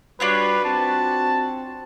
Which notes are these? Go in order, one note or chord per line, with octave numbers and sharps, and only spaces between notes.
G3 D4 F4 F#4 B4 C#5
C4 A5